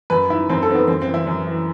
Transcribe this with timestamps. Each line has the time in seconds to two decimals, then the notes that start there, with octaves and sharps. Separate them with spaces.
0.10 F#2 B4
0.29 D#3 E4
0.50 F#2 C4
0.62 A4
0.69 D#3 C4
0.75 B3
0.88 F#2 C4
1.02 C4
1.08 E3
1.14 E4
1.27 F#2
1.47 E3